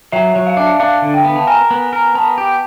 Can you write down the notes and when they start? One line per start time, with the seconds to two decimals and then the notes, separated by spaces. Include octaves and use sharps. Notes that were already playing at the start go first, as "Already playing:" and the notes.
0.12 F#3 E5
0.36 F#3
0.47 F5
0.57 D4 E5
0.67 F5
0.80 D4 F5
1.02 D3
1.14 G5
1.25 B3
1.36 A5
1.47 A#4 G#5
1.71 B3
1.93 A#4
2.15 B3 A5
2.38 G4